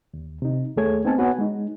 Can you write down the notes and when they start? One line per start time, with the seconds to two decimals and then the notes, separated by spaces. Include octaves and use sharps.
0.14 D#2
0.42 C3 D#4
0.77 D#2 A3 G#4 A4 C#5 G#6
1.05 B3 C4 D#4 G#5 A5
1.18 B3 F#4 B4 C#5 F#5 G#5
1.38 G#3 D#4